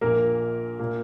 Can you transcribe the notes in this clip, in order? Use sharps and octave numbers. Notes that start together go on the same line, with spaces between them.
A#1 A#2 A#3 A#4
A#2 A#3